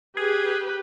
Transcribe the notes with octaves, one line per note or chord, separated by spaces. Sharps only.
G4 G#4 B4